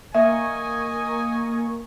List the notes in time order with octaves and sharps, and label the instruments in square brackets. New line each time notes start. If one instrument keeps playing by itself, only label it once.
[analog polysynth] A#3 A#4 C#6 [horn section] D#5 G#5 [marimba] E5